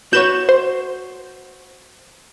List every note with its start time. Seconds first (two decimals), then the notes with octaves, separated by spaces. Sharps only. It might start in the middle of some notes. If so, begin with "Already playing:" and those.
0.13 F#4 B4 C#5 G6 E7
0.49 C5